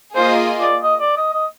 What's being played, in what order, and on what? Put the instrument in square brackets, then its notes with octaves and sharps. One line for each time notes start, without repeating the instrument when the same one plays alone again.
[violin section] A#3 F4 G#4 D#5 [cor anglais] C5
[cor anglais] D5
D#5
D5
D#5
D#5